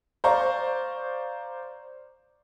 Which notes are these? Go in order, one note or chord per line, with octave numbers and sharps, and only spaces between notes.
C5 D5 F5 A#5 C#6